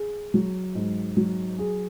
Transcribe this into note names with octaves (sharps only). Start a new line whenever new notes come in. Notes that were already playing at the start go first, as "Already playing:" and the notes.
Already playing: G#4
F#3
G#2
F#3
G#4